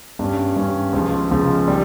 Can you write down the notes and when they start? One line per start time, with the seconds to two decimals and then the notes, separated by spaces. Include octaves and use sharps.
0.19 G2 G3 C#4
0.56 G2 G3 C#4
0.93 C#2 C#3 F3
1.31 C#2 C#3 F3
1.68 D#3 G3